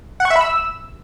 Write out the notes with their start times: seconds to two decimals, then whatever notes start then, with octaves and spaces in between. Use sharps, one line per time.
0.20 F#5
0.25 C#6
0.30 E5
0.36 B5
0.41 E6